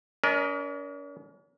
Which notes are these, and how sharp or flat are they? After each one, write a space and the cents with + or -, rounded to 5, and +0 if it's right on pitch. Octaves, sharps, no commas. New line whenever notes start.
C#4 +45 A#4 +25 D#5 +0